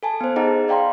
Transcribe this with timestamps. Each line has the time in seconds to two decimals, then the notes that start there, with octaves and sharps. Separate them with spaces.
0.03 A4 G#5 A5
0.21 B3 C5
0.36 D#4 G#4 D#5 F#5 A#5
0.68 D5 F5 G5 A#5 C6